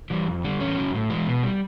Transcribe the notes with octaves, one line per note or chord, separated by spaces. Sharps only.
E3 G3
F2
D3 G3
E2 C#4
C#3 F#3
A2
E3 G#3
B2
G3